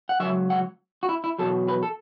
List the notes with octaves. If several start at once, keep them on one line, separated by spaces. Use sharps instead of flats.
F#5
C#2 B2 F#3 E5
F#5
F#4
E4
E4
E2 B2 F#3 A4
B4
A4